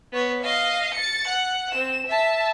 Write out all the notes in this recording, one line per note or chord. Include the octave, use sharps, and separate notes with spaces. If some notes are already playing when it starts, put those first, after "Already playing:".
B3 C#5
D#5 F5
A6 C#7
F#5
C4 E7
E5 A5